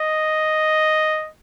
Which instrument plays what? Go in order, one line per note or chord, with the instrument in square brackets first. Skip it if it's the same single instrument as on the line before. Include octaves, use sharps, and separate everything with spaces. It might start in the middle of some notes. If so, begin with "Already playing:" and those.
Already playing: [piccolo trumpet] D#5